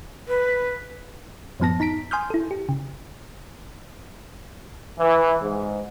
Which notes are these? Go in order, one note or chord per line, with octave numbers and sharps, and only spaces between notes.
B4
F#2 A2 F3 B3 A5 A#6
D#4 A#5 B6 D7
G#5 C6 D#6 F6 G6
E4 A4
G4
C#3
E3
G#2